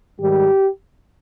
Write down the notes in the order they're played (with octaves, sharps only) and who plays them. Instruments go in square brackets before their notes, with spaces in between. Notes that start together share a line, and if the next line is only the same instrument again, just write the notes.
[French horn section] G#2 D#3 G3 G4